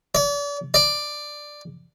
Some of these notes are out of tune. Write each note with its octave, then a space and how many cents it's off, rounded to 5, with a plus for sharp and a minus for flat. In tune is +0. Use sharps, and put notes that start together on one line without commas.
D5 -40
D5 +5